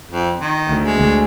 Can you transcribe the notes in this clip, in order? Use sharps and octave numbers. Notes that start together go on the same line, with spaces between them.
F2
D#3
D2
G#3
D2